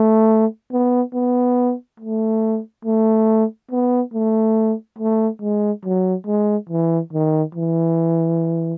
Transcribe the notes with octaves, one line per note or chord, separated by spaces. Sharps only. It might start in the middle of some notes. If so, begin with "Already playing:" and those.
Already playing: A3
B3
B3
A3
A3
B3
A3
A3
G#3
F#3
G#3
E3
D#3
E3